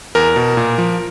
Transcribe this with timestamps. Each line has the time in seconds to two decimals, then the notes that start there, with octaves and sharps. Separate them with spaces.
0.15 E2 A#4
0.36 B2
0.57 A#2
0.78 F3